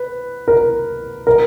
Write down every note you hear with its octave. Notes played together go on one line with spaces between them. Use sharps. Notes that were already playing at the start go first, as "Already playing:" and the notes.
Already playing: B4
A#4
A#4